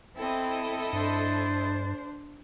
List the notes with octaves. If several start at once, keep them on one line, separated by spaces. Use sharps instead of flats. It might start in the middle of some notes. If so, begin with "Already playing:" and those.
C4 E4 A4 D#5
G2 D4 C5